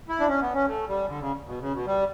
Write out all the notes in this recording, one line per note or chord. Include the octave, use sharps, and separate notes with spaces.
E4
D4
C#4
B3
C#4
A3
G3
D3
C#3
B2
C#3
B2
G3